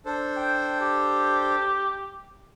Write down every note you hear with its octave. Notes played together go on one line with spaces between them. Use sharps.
D4 A4 C5
G5
G4